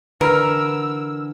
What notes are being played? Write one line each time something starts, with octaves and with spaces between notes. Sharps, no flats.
D3 E3 A#4 B4 B5 E6 F6